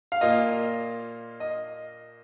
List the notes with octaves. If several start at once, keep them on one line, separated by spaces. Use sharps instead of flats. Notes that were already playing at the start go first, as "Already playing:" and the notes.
F5
A#2 A#3 F4 D#5
D#5